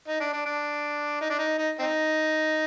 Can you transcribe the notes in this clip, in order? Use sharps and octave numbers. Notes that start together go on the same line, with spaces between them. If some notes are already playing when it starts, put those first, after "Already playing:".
D#4
D4
D4
D4
D#4
D4
D#4
D#4
C4 D#4